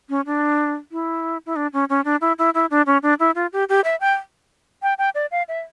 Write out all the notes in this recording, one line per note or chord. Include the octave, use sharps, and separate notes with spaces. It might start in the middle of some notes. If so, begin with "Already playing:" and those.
C#4
D4
E4
E4
D4
C#4
C#4
D4
E4
E4
E4
D4
C#4
D4
E4
F4
G4
G4
E5
G5
G5
G5
D5
F5
E5